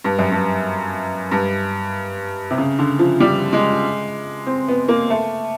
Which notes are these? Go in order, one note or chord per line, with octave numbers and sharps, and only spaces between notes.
G2
F#2
G2
G2
C3
C#3
D3
F3
G3
G#3
C4
B3
A#3
A3